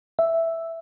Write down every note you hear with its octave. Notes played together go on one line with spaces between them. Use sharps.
E5